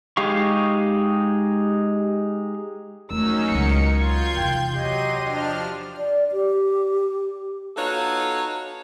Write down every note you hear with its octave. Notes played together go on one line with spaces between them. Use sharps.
G#3 D#4 G4 F5 C#6
E2 F#3 A3 C#4 D#4 A#4 E6
C#2 B3 C#7
F4 C6 G6 G#6
E2 C3 G5
F#3 G4 D#5 C6 D#7
F3 D4 F6
D5
G4
B3 D#4 F4 F#4 A4 C#5